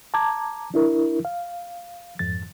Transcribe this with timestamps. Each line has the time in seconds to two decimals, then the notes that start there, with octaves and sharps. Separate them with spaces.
0.14 A5 A#5 D6 G#6
0.74 D4 E4 A#4
1.25 F5
2.19 F2 G#2 A6